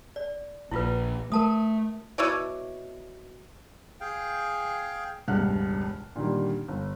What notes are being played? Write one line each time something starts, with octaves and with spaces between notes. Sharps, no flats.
D5
A#1 E4 F4 B4
A3 A#4 A5 D#6
B2 E4 C#5 D5
G#4 F5 G5
E1 C#2 G2 F#5 F6 F#6
A#2 D3 D#3 G3
G1